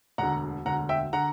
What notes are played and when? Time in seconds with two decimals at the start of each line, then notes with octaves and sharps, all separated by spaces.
0.18 E1 D2 D3 F#5 A#5
0.66 E1 D2 D3 F#5 A#5
0.89 E5 G5
1.13 D3 F#5 A#5